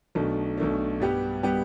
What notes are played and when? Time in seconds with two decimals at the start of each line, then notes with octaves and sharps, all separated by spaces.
0.15 B1 B2 A3 D4
0.58 B1 B2 A3 D4
1.00 G2 G3 B3 G4
1.43 G3 B3 G4